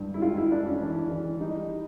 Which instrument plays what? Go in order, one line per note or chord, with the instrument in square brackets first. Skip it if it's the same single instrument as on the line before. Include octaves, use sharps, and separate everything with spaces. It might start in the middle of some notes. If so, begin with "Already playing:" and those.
Already playing: [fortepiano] G2
E4
G#1 F4
E4
G#1 D4
C#4
E3 D4
E3
G3 D#4